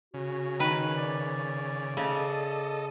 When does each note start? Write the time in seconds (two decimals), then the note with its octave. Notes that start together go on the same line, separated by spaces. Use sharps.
0.14 C#3 F#4
0.59 D#3 B4
0.97 D5
1.97 C#3 A4 D#5